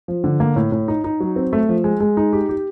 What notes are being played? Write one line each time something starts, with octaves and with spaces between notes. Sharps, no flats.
F3
D3
A#3
A2
A2
D#4
D#4
F#3
C4
A3
F3
G#3
G#3
D#4
G4
G4